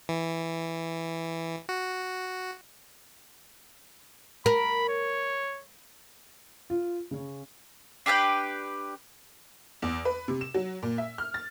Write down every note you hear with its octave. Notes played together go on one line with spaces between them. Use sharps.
E3
F#4
A#4 B5
C#5
F4
C#3 C#4
D4 G4 B4 G5
E2
B4
C3
E7
F#3
A#2
E5
F6
A6